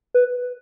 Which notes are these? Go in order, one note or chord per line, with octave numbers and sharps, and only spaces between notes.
B4